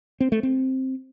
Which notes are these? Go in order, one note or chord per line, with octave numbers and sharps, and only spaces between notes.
C4
A3
C4